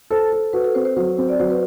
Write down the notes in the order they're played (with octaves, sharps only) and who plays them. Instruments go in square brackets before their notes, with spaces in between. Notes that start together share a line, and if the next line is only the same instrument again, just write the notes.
[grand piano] A4 [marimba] C5
[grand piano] A4
[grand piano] F#4 [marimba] B4
[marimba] A4
[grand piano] C4 [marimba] C5
[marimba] C5
[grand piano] F#3 [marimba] C5
[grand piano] C4
[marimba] D5
[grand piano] F#3 [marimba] C5
[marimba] B4